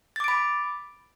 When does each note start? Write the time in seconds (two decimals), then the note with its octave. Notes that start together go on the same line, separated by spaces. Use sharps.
0.16 A6
0.20 D6
0.24 D7
0.28 B5